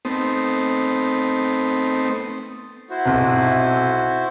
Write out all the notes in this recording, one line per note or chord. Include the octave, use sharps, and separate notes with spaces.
A3 B3 C4 D#4 C5
E4 F#4 C5
B1 C3